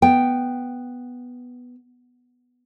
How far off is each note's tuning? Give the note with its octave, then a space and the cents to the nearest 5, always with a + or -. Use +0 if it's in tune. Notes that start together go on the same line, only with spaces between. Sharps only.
B3 +0 G5 +0